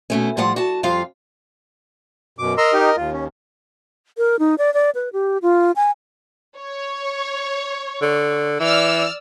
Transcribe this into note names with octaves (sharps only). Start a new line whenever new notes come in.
B2 A3 C#4
A2 F3 G3 F4 F#5
F#4 A5
F2 G3 F4 F5
F#2 B2 D6
A#4 D#5 A#5 C6 E6
D#4 G4
D#2 F4
C#4
A#4
D#4
D5
D5
B4
G4
F4
G#5
C#5
D3
E3 D5 E6 F6